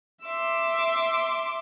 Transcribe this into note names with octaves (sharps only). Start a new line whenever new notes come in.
E5 C6 D6